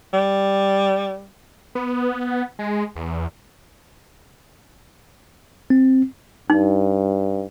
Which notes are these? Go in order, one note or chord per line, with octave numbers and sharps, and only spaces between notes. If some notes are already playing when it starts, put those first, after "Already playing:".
G3
B3
G#3
E2
C4
G2 D#4